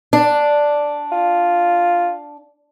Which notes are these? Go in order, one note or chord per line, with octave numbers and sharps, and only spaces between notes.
D4
F4